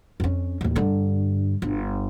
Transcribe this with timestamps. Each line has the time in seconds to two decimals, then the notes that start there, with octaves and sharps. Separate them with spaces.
0.20 F2 C#4
0.61 A1 D#2
0.76 G2 D3
1.62 G1